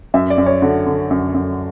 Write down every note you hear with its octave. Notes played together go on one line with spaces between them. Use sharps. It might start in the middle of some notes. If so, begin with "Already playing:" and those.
F#2 E5
D5
F#2
C#5
D3 F#4
D3
F#2
F#2